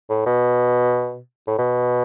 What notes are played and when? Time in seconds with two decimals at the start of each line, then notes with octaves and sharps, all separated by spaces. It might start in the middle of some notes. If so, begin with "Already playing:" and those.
0.10 A2
0.26 B2
1.47 A2
1.58 B2